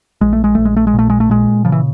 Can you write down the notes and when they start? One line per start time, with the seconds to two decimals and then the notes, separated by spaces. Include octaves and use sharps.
0.21 A#1 G#3
0.33 A3
0.44 G#3
0.55 A#1 A3
0.65 G#3
0.76 A3
0.87 G#3
0.94 A#2 A3
1.10 G#3
1.20 A3
1.30 A#2 G#3
1.65 C#3 F3
1.72 E3